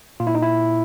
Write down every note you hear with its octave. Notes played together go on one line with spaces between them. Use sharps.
A#2 F4
E4
D#4
E4